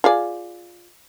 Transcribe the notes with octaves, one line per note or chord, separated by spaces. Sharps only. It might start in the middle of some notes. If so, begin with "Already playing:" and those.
F4 G#4 D5